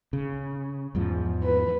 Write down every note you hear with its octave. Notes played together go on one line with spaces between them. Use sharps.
C#3
E2 G#2 F3
B4